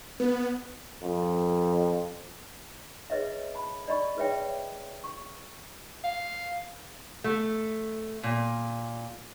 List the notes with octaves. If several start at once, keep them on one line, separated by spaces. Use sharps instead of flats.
B3
F2
G#4 B4 C#5 D#5 E5
A5 B5
D5 D#5 B5 C#6
G#4 B4 C#5 E5 G5
C#6
F5
A3
A#2